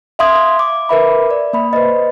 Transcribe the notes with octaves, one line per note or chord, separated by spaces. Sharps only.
E5 F5 C6 D#6 G#6
D6
A#4 B4 E5 B5
D5
A#3 B5
B4 C5 D#5